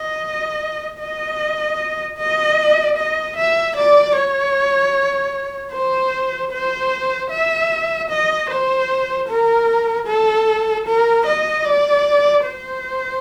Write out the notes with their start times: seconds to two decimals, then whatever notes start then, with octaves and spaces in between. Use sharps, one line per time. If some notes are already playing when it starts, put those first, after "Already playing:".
Already playing: D#5
1.00 D#5
2.18 D#5
2.97 D#5
3.36 E5
3.76 D5
4.15 C#5
5.72 C5
6.51 C5
7.30 E5
8.10 D#5
8.49 C5
9.29 A#4
10.07 A4
10.87 A#4
11.26 D#5
11.65 D5
12.45 C5